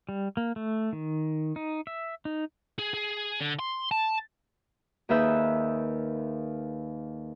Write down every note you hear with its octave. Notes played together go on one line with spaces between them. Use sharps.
G3
A#3
A3
D#3
D#4
E5
D#4
G#4
G#4
D3
C6
A5
D#2 D#3 G#4 B4 E5 G6